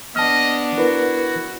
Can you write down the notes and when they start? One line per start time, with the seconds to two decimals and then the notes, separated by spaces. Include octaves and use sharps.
0.16 B3 D4 D#5 A5 F6
0.78 E4 F#4 A#4 B4